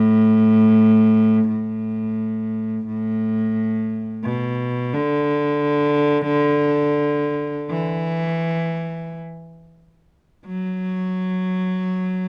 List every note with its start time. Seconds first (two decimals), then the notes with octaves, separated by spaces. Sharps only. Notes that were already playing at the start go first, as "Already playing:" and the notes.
Already playing: A2
1.48 A2
2.87 A2
4.24 B2
4.94 D3
7.70 E3
10.46 F#3